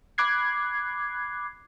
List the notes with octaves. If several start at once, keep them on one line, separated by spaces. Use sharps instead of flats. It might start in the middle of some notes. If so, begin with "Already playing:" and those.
B5 D6 F#6 G#6 C7